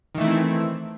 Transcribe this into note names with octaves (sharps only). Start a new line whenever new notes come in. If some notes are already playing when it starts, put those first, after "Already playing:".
D#3 E3 A3 C4 E4